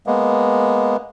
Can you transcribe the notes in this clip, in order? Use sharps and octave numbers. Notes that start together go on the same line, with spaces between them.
G#3 A#3 B3